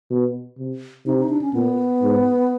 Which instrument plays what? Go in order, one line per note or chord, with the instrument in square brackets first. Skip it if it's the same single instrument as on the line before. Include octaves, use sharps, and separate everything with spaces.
[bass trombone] B2
C3
[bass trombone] C3 [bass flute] D#4
[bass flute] D#4
D4
C#4
[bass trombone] A#2 [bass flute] B3
[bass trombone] G#2